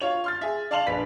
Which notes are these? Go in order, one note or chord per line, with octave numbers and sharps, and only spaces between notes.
F4 C#5 F7
C6 F6 A6
G#4 E5
D5 F5 A5 C6 F7 F#7
A#1 D4 B4 B6